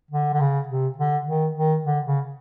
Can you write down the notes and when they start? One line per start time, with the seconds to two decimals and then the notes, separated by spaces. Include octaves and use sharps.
0.11 D3
0.34 D3
0.40 C#3
0.68 C3
0.98 D3
1.27 D#3
1.55 D#3
1.85 D3
2.05 C#3